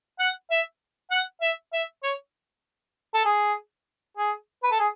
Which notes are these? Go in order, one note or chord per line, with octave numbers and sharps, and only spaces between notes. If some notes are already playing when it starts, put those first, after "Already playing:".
F#5
E5
F#5
E5
E5
C#5
A4
G#4
G#4
B4
A4
G#4